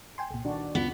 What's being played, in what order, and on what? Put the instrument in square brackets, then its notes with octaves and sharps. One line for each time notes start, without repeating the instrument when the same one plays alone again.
[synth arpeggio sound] G5 G#5 C6
C2 A#2
[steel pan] D#3 D4 F#4
[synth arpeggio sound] D2 F4 [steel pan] C#3 [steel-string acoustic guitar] B3